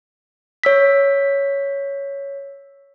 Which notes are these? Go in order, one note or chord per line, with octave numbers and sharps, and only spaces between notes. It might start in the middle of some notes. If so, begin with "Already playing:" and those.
C#5 E6 B6